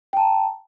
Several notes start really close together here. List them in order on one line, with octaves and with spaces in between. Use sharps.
G5 A5 A#5